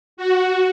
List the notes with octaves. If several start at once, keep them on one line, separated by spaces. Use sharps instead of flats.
F#4